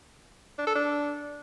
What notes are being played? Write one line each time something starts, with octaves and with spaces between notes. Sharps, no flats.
D4
A4
D4